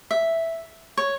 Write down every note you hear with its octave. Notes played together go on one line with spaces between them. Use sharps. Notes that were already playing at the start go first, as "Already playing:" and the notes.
E5
C#5